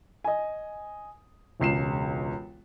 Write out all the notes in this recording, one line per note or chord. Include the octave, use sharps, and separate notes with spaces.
D#5 G#5
E1 C#2 C7 E7